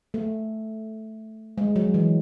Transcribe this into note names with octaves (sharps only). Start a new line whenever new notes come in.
A3
G#3
F#3
E3